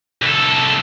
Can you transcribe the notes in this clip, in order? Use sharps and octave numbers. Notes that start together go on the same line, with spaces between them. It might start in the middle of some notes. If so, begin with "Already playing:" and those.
C2 A4